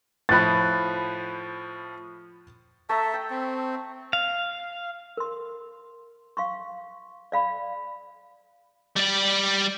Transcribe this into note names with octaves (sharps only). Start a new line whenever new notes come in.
A2 F3 B5 F#6 A6
A3 E5 A5 A#5
G5
C4
F5
A#4 C6
F5 C6 C#6
D5 F5 B5
G3 D5